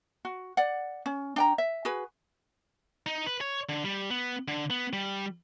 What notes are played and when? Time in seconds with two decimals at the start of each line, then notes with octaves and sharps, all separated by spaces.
0.25 F#4
0.57 D5 F#5
1.06 C#4
1.36 D4 G5 A#5
1.58 E5
1.85 F#4 G#4 B4
3.06 D#4
3.26 B4
3.41 C#5
3.69 D3
3.85 G3
4.10 B3
4.48 D3
4.70 B3
4.93 G3